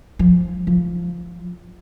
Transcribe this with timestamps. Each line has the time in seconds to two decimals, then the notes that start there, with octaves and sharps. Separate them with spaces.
0.19 F3
0.67 F3